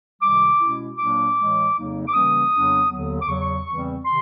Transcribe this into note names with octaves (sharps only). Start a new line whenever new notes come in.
C#2 C3 D#3 G3 D6
B2 G#3 C#4 E4
A#2 F#3 A#3 D4 D6
A2 E3 G#3
F2 C#3 F#3 A#3 D#4
D6
C#3 E3 G3 A#3 C#4 D#6
F2 C#3 F#3 B3 D4
D#2 D3 F#3 B3
D6
E2 C#3 F#3 C#6
E2 C#3 E3 G3 C4
C3 D#3 C6